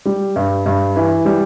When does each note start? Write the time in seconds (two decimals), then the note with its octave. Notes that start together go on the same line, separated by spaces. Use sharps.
0.05 G3
0.36 G2
0.66 G2
0.96 E3
1.25 G3